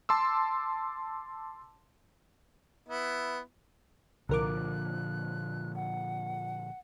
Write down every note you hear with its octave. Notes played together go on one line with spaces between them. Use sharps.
A5 C6 D6 E6
B3 E4
C2 A#2 D3 F3 A#4 D6 F#6
F#5